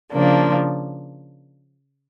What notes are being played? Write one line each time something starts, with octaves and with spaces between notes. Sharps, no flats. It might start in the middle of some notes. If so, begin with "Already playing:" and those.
C#3 F3 A#3 D4